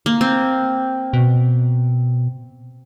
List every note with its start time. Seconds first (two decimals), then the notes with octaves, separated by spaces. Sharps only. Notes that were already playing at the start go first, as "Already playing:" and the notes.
0.06 A#3
0.21 C4
1.13 B2